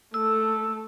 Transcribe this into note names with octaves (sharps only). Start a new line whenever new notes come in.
A3 A4 E6